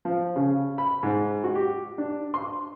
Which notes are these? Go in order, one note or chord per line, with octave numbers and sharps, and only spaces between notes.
F3
C#3
B5
G#2
F#4
G4
D4
C6